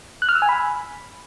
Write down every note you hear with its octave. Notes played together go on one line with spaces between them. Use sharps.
F#6
F6
E6
G#5
B5